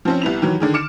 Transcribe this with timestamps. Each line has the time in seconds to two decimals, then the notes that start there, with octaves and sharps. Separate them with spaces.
0.05 F3 C4 C#4
0.22 C2 B3 E4 F7
0.42 D#3 E3 F#3
0.60 D3 D#3 G#4
0.74 D6 F6 C#7 E7